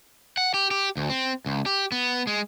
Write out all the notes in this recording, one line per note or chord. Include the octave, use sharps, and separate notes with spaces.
F#5
G4
G4
D2
C4
C#2
G4
B3
G#3